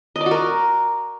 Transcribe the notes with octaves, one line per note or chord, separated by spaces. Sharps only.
D#5
D5
F#4
A#4